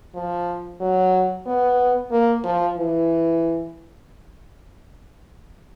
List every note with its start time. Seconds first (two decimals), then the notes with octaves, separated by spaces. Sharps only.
0.15 F3
0.81 F#3
1.46 B3
2.11 A#3
2.44 F3
2.78 E3